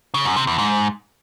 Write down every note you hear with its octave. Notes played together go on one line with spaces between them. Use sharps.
C#3
F#2
C3
E2
G#2